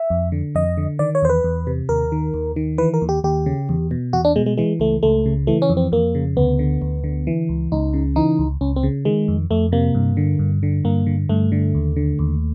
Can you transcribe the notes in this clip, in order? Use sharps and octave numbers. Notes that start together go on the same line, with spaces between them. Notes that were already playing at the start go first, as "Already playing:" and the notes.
Already playing: E5
F2
D3
F2 D#5
D3
D#3 D5
C#5
E2 C5
B4
E2
C3
D#2 A#4
D#3
D#2
D#3
E3 B4
A#4
D#2
G4
D#2 G4
C#3
E2
B2
E2 F#4
D4
B2 G#3
G#3
E3 G#3
C#2 A3
C#2 A3
C#3
E3 A3
C#4
F2
C4
F2 A#3
C#3
D2 B3
D3
D2
D3
E3
C#2
C#2 D#4
C#3
E3 D#4
C#2
C#2 C#4
C4
C#3
D#3 G#3
F2
F2 A3
C3 A#3
G2
D3
G2
D3
G2 A#3
D3
G2 A3
D3
D#2
D3
D#2